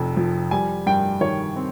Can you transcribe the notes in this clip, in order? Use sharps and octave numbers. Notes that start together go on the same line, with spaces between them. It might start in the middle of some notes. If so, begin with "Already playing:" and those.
Already playing: F1 F2
F3
G3 G#5
G2 G5
D#3 C#5
C4